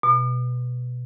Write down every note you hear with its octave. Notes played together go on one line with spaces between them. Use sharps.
B2